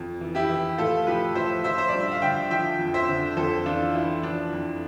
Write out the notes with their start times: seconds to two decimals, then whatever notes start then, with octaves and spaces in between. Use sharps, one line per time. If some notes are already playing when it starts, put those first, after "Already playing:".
Already playing: F2
0.21 E3
0.35 E4 G4
0.49 E3
0.78 A2 F4 A4
1.07 F3 G4 B4
1.35 F3 C5 E5
1.64 F3 C5 E5
1.78 C5
1.89 G2 D5
2.00 E5
2.12 F5
2.22 D3 E5 G5
2.50 F3 E5 G5
2.79 F2
2.94 C5 E5
3.08 D3
3.37 F2 A4 C5
3.65 E3 D4 F4
3.95 E3 E4
4.23 F3 D4
4.53 F2